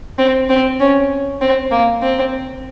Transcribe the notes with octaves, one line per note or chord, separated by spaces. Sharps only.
C4
C4
C#4
C4
A#3
C4